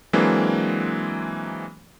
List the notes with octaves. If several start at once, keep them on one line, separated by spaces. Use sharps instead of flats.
E3 F#3 G#3 A#3 C4 D4